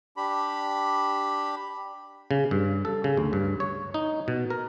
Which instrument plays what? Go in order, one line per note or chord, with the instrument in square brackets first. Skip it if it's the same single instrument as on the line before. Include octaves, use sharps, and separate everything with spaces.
[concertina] D4 G4 B5
[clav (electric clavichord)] C#3
G2
A4
C#3
D2
G2
C#5
D#4
B2
A#4